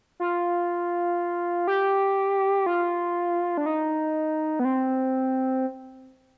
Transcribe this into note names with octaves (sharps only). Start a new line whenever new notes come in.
F4
G4
F4
D4
D#4
B3
C4